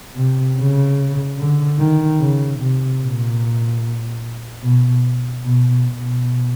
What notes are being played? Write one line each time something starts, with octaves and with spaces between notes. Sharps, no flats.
C3
C#3
D3
D#3
C#3
C3
A#2
B2
B2
B2